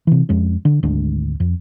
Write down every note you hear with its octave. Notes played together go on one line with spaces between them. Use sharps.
C3 E3
F2 G#3 C#4
D3
G#1 D2 G#3 D4
F2